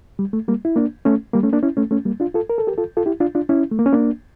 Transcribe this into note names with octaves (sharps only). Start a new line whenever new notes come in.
G3
A3
G3 A#3
E4
A#3 D4
A3 C#4
G3 A#3
A3 C#4
A#3 D4
C#4 E4
A3 C#4
A3 C#4
G3 A#3
D4 F4
F4 A4
A#4
A4
G4 A#4
F4 A4
F4 A4
E4 G4
D4 F4
D4 F4
C#4 E4
A3
A#3
C#4
A#3 D4